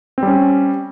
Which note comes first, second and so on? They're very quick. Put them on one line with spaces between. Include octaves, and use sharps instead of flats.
C4 G3 C#4